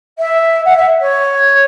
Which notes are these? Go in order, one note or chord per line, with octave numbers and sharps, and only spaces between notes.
E5
F#5
E5
C#5